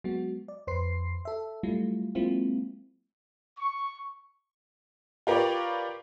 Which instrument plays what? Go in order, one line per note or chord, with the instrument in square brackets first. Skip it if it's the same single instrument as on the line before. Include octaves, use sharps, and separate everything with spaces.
[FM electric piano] F#3 G#3 B3 F#4
D5
F2 B4 C5 C6 C7
A4 E5
F#3 G3 A3 E4 F4
F#3 G#3 A#3 C4 E4 F4
[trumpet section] C#6
[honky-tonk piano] F4 G4 A#4 B4 C#5 D5